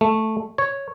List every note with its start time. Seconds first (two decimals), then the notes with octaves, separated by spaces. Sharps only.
0.01 A3
0.58 C#5